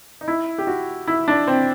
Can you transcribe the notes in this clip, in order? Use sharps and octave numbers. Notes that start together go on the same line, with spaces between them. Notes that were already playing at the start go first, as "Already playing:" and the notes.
D#4
E4
G4
F#4
E4
D4
C4